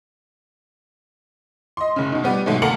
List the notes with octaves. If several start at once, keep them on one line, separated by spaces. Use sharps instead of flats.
D#5 C6
F#1 C#3
B2 D#4
G3 B3 G4
G#2 B2 F#3 A3
D2 A#3 A4 A#5 C#7 F#7